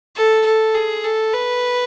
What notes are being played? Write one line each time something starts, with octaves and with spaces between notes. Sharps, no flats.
A4
A4
G#4
A4
B4